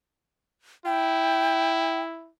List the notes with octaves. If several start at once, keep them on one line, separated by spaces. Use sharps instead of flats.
E4 G5